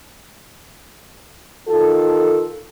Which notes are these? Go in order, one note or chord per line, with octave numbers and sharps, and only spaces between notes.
D#3 F4 A4